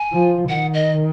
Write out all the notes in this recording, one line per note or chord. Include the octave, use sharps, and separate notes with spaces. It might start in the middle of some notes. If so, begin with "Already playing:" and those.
Already playing: G#5
F3
D#3 F#5
D#5